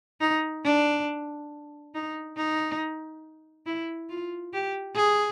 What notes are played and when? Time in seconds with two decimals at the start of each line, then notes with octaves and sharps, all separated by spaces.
0.21 D#4
0.64 D4
1.94 D#4
2.37 D#4
3.66 E4
4.10 F4
4.53 G4
4.96 G#4